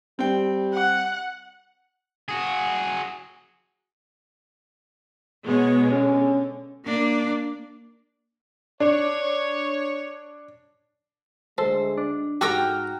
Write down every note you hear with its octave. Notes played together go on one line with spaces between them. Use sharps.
G3 C4 G5
F#5
F#4 G#4
B2 G#3 B3 C#5
D3 C#4
A#3 D4
D4 C#5
D2 G#3 A4 C5
D4
G#2 F#4 G4 A4 G5 A#5 C#6 F6